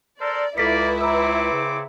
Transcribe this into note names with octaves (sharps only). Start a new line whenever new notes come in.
A4 A#4 C5 D5
C#2 A#3 E4 A4 B4 D5 B6 C#7
C4 C#5 A#5 D6 E6
C#3